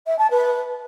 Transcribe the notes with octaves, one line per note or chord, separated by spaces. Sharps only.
E5
A5
B4